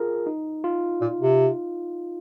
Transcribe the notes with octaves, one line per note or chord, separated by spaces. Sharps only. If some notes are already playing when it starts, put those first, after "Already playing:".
Already playing: F4 G#4 A#4
D#4
F4
A#2
C3